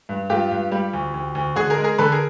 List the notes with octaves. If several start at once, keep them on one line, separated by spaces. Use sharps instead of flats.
G2
G2 F4 G4
G2
G3
D2
D2
D2
D3 F#4 G#4
G#4 A#4
G#3
G#4 A#4
D3 A4 B4
G#4 A#4